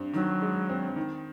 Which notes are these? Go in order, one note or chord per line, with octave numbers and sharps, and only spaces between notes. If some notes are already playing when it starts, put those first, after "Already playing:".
Already playing: G2 C4
D#3 F#3
G#3
C4
D#3